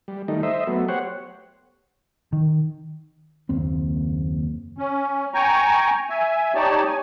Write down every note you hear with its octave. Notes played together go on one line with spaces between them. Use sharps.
G3
D#3 G3 A3 D#4
C5 D#5 E5
F#3 A3 B3
G4 C5 C#5 F#5
D#3
F#1 D#2 C4
C#4
G5 G#5 A#5 C#6
E5 G#5
D#4 G4 C#5 D5 A5
G#5